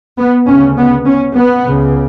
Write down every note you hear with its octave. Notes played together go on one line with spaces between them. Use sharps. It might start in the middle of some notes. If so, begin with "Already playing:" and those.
B3
D2 C#3 C#4
B3
C#4
B3
C#2 C#3